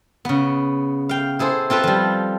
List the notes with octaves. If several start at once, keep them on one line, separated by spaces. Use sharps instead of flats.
C#3 B3
F5 G5
E4 G#4 A4 C5
C4 F4 A4 B4
F3 G3